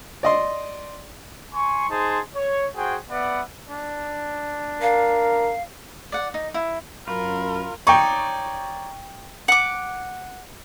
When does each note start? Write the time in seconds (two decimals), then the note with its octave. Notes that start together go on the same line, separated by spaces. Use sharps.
0.23 D5 D#5 C6
1.54 G#5 C6 C#6
1.90 D#4 G#4 C5 A5 C6
2.35 C#5
2.76 F#4 G#4 C5 G5 G#5
3.10 B3 B4 D5 E5 F#5
3.69 D4
4.82 A#4 F5
6.12 D5 F#5
6.34 D#4
6.54 E4
7.08 F#2 F4 A#4 B5
7.87 D#4 C#5 D5 G5 C#6
9.48 F#5 D6